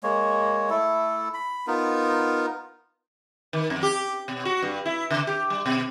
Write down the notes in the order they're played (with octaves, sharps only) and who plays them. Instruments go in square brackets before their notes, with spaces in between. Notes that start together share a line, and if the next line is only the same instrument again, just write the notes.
[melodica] G#3 A#3 C#5
A3 E4 A4
B5
B3 D#4 F4 A#4
[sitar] D#3
F2
G4
B2
F#4
G2
E4
C#3
G4
G3
B2